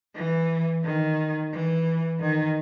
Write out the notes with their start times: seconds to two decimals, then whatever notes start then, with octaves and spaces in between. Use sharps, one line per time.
0.14 E3
0.83 D#3
1.52 E3
2.19 D#3